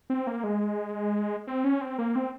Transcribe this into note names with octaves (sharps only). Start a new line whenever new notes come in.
C4
A#3
G#3
C4
C#4
C4
A#3
C4